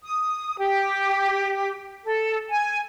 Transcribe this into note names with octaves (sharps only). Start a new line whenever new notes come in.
D#6
G4
A4
G#5